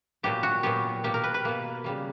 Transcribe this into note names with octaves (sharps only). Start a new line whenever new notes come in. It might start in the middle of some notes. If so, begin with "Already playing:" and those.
A#2 F#3 B3 G4
F#4
A#2 F#3 B3 G4
B2 A#3 G4
A#4
B4
B4
B2 A#3
C#3 G3 A#3